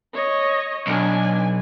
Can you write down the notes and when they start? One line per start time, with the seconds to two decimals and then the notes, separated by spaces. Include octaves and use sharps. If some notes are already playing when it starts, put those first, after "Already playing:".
0.13 C#5 D#5
0.87 B1 D4 G#5